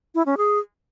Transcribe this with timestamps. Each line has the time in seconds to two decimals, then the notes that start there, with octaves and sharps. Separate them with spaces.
0.15 E4
0.26 C#4
0.37 G#4